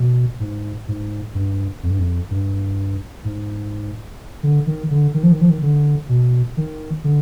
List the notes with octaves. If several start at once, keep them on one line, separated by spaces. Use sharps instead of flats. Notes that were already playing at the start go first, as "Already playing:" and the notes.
Already playing: B2
G#2
G#2
G2
F2
G2
F2
G2
G#2
D3
D#3
D3
D#3
F3
D#3
F3
D#3
D3
B2
D#3
D3